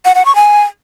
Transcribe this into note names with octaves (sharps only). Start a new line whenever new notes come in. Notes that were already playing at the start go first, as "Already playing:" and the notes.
F#5
F#5
C#6
G#5